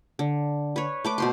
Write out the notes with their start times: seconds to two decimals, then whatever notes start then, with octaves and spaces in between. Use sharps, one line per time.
0.19 D3
0.76 B4 C#5
1.05 A3 B4 D6
1.18 B2 C5 C6